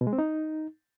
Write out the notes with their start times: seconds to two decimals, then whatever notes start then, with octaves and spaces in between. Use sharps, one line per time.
0.01 B2
0.07 G#3
0.13 C4
0.18 D#4